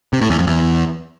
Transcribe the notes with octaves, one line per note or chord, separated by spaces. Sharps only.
C3
A2
E2
F2
E2